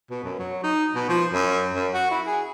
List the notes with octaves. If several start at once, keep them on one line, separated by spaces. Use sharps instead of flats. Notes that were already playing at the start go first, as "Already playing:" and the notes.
B2
F#2
F#3
D#4
B2
F3
F#2
F#2
F#4
E4
G#4